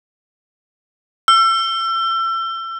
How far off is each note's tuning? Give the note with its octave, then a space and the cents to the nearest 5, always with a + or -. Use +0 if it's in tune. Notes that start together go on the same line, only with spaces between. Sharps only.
E6 +35